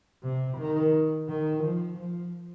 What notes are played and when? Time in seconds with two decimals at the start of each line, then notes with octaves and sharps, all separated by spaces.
0.23 C3
0.58 D#3
1.29 D#3
1.64 F3
1.99 F3